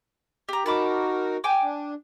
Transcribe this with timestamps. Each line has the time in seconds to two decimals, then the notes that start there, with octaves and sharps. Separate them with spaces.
0.49 G4 A#5
0.66 D#4 F#4 A#4 A5 B5 D6
1.44 G5 G#5 D6
1.62 D4